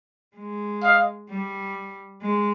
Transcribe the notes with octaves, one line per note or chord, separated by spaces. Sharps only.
G#3
D#5 F5
G3
G#3